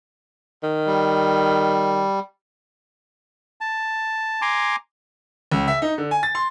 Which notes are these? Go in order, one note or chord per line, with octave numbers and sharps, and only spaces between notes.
D#3
G3
A5
G#5 A#5 C6 D6
C#2
E5
D#4
D3
G#5
A6
C6